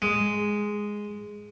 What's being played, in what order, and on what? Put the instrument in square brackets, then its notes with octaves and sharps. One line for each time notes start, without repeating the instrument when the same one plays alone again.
[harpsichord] G#3